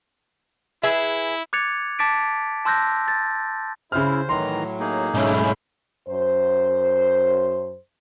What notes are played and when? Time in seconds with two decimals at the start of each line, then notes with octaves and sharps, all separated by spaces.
0.83 E4 G#4 B4 E5
1.53 D6 F#6 G#6 A6 C#7 F7
1.99 A5 D6 A6 B6 D7
2.65 A5 C6 E6 F#6 G6 A#6
3.08 A6
3.92 C#3 E4 C5 F6
4.29 A2 D#3 E3 F#3 A#5 C6
4.80 A#3 D#4 G#4
5.14 B1 G#2 A3 C#4 E4
6.09 F#2 C5